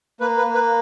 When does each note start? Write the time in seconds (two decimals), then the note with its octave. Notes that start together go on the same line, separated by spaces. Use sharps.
0.21 A#3 B4
0.38 B4
0.47 A#3
0.54 B4